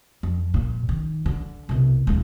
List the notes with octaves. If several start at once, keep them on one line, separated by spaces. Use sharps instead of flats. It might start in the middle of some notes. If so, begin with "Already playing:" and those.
F2
A#2
D#3
D3
C2 B2
D#1 G#3